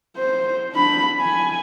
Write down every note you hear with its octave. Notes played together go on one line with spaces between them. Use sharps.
C5
D4 B5
G#5